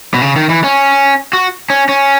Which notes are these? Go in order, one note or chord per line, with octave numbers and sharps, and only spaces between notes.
B2
C#3
D#3
E3
C#4
F#4
C#4
C#4